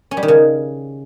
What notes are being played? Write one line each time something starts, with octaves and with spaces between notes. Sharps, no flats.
C#4
G3
D#3
C#3